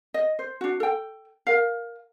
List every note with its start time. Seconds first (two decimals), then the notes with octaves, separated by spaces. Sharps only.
0.14 D#5
0.39 C5
0.61 D4 F#4
0.80 A4 G5
1.47 A#4 F5